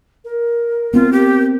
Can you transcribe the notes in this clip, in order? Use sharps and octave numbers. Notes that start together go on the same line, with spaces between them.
A#4
B3 C4 F4
G4